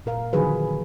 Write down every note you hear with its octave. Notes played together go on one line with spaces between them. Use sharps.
A#2 A#4 F5
D3 D#3 F3 F#3 G#4 B4